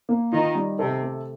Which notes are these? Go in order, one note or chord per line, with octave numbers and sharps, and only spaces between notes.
A#3
D#3 F4
G3
C3 A4
A3